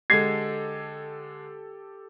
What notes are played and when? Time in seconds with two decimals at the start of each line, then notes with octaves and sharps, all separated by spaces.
0.10 D3 G#3 G4 A4 G#6 C7